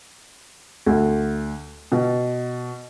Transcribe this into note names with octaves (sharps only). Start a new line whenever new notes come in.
D2
B2